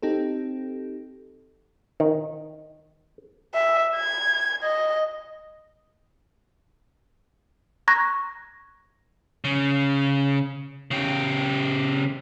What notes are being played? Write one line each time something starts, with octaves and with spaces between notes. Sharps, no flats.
C4 D#4 G4 A4
D#3
E5
G#6
D#5
A#5 C#6 F#6 G#6 A#6
C#3
C#3 G4